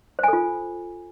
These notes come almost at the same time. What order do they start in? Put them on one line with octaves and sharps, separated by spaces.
C5 G#5 A4 F4